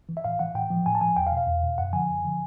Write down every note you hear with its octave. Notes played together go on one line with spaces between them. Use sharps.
E3
E5
A2 F5
E3 F#5
A2 G5
F3
A2 G#5
A5
F3 G#5
E2 G5
F5
B2
F5
E2
B2
F#2 F#5
D3 F3 G#5
F#2
D3 F3